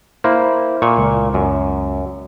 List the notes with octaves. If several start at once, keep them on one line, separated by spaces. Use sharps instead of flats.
A#3 E4 C5
A#2 C#6
C#2
F#2